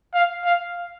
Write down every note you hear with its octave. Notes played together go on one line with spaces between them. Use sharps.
F5
F5